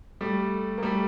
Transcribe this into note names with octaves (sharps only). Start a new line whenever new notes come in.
G3 A3
A#3
G3 A3